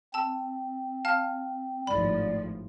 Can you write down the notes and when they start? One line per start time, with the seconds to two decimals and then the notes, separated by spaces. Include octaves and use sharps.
0.14 C4 A5 E6
1.05 F5 A5 F6
1.87 G#1 A2 F3 D5 B5